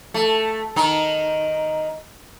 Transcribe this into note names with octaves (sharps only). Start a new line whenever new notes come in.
A3
D#3 D#4